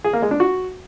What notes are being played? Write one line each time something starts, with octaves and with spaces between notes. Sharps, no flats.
G#4
A#3
G#3
D4
F#4